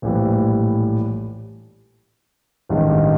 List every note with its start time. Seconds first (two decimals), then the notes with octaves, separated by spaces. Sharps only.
0.02 A#1 A2 E3 G3
2.69 A1 G2 D#3 G#3